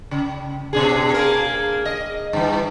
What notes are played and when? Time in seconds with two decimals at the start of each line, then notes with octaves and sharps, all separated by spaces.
0.11 C#3
0.73 B2 D4 G#4
1.14 A#3 G#4 A#4
1.85 D#5
2.33 G2 E3